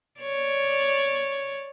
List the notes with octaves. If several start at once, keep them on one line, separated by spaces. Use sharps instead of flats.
C#5 D5